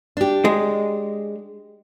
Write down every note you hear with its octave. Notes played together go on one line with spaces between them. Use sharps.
D4 G4
G#3